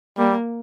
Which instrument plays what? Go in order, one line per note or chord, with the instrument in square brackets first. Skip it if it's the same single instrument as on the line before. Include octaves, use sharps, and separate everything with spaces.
[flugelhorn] G3 [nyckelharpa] A#3